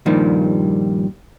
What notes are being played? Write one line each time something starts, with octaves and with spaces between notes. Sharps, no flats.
G2 A#2 D#3 F3 G3